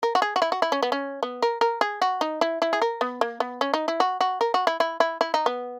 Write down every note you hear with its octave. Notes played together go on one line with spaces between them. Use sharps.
A#4
F#4
G#4
F#4
E4
F#4
E4
C#4
B3
C#4
B3
A#4
A#4
G#4
F#4
D#4
E4
E4
G#4
A#4
B3
A#3
B3
C#4
D#4
E4
F#4
F#4
A#4
F#4
E4
E4
E4
E4
D#4
B3